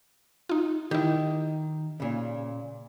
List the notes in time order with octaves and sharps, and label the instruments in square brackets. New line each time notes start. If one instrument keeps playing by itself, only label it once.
[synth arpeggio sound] D#4 F4
[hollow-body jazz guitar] D#3 [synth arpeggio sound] E4 G4
[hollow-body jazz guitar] A#2 C#3